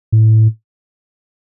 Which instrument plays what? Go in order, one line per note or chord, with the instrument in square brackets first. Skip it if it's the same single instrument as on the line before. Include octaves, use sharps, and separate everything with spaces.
[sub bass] A2